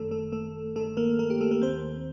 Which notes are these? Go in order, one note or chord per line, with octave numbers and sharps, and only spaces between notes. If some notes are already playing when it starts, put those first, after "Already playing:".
Already playing: G1 F#2 D#3 A3 A4
A3 A4
A3 A4
G1 G2 D#3 A3 A4
A#3 A#4
A#3 A#4
G4
A3 A4
A#3 A#4
D#2 D#3 C4 C5